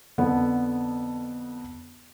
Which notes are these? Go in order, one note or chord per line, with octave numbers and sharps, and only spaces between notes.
F2 D3 B3